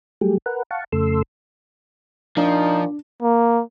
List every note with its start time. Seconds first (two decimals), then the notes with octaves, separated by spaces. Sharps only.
0.21 F#3 G3 A3 G4 G#4
0.46 A#4 B4 F#5
0.71 F5 F#5 A5 C#6
0.93 F2 C#3 A3 A4 C6 E6
2.37 A#2 F3 D4 D#4
3.22 A#3